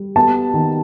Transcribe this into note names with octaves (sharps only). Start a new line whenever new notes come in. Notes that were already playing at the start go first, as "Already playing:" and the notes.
Already playing: G3
B3 A5
D#3